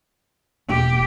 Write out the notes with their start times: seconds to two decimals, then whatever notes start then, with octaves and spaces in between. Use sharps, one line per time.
0.69 E1 A#3 G4